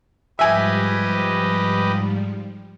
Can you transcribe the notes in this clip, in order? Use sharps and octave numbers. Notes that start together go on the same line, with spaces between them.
G#2 F3 G3 G4 B4 D#5 E5 G#5